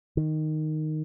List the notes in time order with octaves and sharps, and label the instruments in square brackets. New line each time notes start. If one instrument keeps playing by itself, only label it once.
[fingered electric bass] D#3